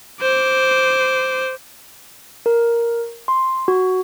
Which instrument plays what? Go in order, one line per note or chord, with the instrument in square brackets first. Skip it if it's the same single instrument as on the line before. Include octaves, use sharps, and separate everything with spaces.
[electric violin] C5 D6
[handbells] A#4
C6
F#4